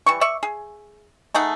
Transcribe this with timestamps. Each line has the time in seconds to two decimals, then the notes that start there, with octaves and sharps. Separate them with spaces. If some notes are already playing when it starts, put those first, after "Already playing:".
0.06 E3 G3 C#6
0.21 D5 E5 C#6
0.43 G#4
1.34 A3 D#4 G#4 F#5